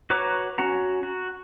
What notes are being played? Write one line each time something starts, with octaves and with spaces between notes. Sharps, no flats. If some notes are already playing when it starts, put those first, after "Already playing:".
F#4 B4 C#5 A#5 D6
C#4 F#4 F#5 A#5
F#4